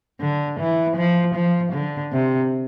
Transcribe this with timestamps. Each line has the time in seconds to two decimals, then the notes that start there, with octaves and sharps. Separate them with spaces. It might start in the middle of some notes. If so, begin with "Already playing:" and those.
0.22 D3
0.60 E3
0.97 F3
1.35 F3
1.73 D3
2.12 C3